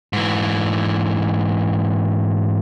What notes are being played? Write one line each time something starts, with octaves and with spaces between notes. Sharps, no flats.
G#2 E3